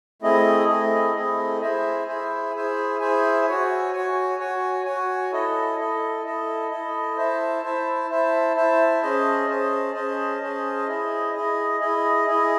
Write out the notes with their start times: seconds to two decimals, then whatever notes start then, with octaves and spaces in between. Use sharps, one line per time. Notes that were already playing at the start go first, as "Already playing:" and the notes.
0.22 A3 C4 E4 G#4 D#5
0.68 A3 C4 E4 G#4 D#5
1.15 A3 C4 E4 G#4 D#5
1.61 E4 G#4 C5 E5 G#5
2.07 E4 G#4 C5 E5 G#5
2.54 E4 G#4 C5 E5 G#5
3.00 E4 G#4 C5 E5 G#5
3.47 F#4 C#5 G#5
3.93 F#4 C#5 G#5
4.39 F#4 C#5 G#5
4.85 F#4 C#5 G#5
5.32 E4 A4 D#5
5.78 E4 A4 D#5
6.24 E4 A4 D#5
6.71 E4 A4 D#5
7.16 E4 C5 E5 A5
7.63 E4 C5 E5 A5
8.09 E4 C5 E5 A5
8.56 E4 C5 E5 A5
9.02 C#4 G#4 C5 D#5 A5
9.48 C#4 G#4 C5 D#5 A5
9.94 C#4 G#4 C5 D#5 A5
10.41 C#4 G#4 C5 D#5 A5
10.87 E4 G#4 D#5
11.34 E4 G#4 D#5
11.80 E4 G#4 D#5
12.26 E4 G#4 D#5